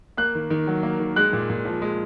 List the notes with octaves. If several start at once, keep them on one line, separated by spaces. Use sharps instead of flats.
A#3 F#6
D#3
D#3
F#3
A#3
D#3
G#3 F#6
A#2
A#2
F3
G#3